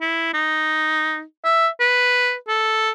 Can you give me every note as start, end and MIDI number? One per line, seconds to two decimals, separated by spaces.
0.01 0.33 64
0.34 1.22 63
1.45 1.68 76
1.80 2.35 71
2.48 2.91 69